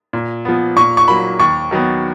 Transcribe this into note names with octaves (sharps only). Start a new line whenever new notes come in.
A#2
F3 B3
A#2 C#6
C#6
F#3 A#3 B5
D#2 C#6
D#3 F#3 B3